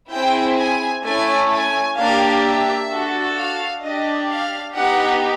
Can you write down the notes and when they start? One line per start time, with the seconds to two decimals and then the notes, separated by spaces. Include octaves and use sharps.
0.11 C4 E4 G#4 G5
0.58 G#5
1.04 A3 C#4 E4 G#5
1.51 G#5
1.97 A#3 D4 G4 F5
2.42 E5
2.89 D4 F#4 A4
3.35 F5
3.81 D4 G4 D#5
4.28 F5
4.73 B3 D#4 G4 F#5